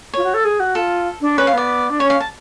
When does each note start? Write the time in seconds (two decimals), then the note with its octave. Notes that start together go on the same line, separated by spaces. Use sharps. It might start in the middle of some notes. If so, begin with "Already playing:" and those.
0.14 F4 C#5
0.24 F#4
0.34 A4
0.45 G#4
0.60 F#4
0.75 F4 A4
1.21 D4
1.37 C#4 B4
1.47 F5
1.53 B3 D5
1.90 D4
1.99 C#4 C#5
2.10 F5
2.20 A5